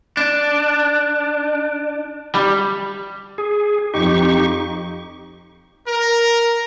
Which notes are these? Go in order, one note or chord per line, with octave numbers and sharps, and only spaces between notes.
D4
G3
G#4
F2 D#4 G4 C#6
A#4